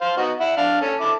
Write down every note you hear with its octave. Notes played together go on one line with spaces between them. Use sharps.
C5 F5
B3 D#4 F#4
E4 F#5
D4 F5
C#4 A4
E4 A4 D6